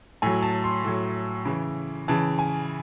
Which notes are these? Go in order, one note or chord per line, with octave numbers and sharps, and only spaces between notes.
A2 F#3 G#5
A5
C6
A2 F#3
C#3 E3
C#3 E3 A5
G#5